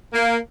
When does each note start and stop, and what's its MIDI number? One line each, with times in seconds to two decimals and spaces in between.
0.14 0.37 58